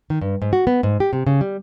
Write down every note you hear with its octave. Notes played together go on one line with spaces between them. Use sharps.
D#3
G2
G#2
F#4
B3
G#2
G4
C3
C#3
G3